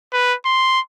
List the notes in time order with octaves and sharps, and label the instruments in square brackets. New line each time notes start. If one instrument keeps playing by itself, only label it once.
[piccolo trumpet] B4
C6